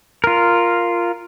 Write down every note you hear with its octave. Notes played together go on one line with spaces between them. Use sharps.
F4 A#4